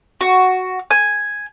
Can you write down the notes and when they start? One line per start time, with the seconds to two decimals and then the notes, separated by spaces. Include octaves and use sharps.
0.21 F#4
0.91 G#5